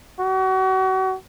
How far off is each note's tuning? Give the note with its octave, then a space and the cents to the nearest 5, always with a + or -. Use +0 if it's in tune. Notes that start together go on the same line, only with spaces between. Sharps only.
F#4 +35